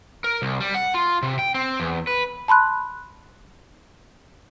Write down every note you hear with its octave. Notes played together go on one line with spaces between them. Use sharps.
A#4
C2
G3
F#5
F4
C3
G5
C4
E2
B4
A5 B5 C6 F#6